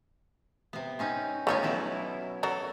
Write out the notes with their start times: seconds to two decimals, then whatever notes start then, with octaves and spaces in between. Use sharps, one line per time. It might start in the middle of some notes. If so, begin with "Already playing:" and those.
0.73 C3 B3
0.99 C4 C#4 D#4
1.47 A3 B3 D#4 F4 G4 C#5
1.63 B2 F#3 E4
2.43 F#3 A4 A#4